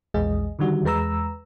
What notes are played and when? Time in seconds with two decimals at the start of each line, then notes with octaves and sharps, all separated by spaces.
0.14 A#1 E2 G#3 G#4 D#5
0.59 D3 D#3 G3 F#4
0.84 E2 G#3 B4 A#5 E6